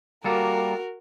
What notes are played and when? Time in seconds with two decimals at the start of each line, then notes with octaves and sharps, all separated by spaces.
0.24 G3 A#3 F#4 A4 A#4